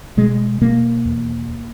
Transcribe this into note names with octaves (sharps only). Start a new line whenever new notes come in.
B2 G#3
B2 A#3
E2